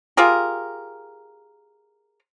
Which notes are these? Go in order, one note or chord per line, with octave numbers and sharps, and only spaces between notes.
F4 G4 G#4 A#4